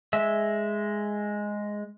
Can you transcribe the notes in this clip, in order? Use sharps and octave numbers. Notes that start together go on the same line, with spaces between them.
G#3 E5